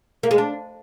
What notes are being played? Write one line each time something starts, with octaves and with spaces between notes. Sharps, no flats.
A#3
G#3
D4